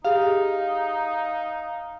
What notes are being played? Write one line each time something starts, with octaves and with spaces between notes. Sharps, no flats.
D#4 G4 G#4 F5